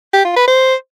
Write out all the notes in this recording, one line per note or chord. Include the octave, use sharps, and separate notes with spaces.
G4
F4
B4
C5